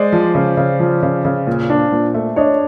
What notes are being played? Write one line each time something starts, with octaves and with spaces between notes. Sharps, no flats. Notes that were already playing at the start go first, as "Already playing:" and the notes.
Already playing: G#3 C5 D5
F3
C#3
C#3
F3
C#3
C#3
A#2
D4
A#2
A3
D4 C#5 D#5